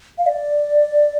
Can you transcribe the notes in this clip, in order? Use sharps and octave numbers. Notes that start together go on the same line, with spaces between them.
F5
D5